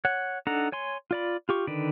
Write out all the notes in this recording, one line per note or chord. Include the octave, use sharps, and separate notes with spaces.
C#5 F#5
D4 D#4 A4 F#5 A#5
C#5 G#5 C6
F4 D5 B5
F4 G4 C#6
D3 D#3 B4 D5